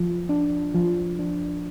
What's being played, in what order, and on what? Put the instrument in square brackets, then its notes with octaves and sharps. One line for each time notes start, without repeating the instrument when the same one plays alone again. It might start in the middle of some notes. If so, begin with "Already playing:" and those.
Already playing: [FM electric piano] F3
D4
F3
D4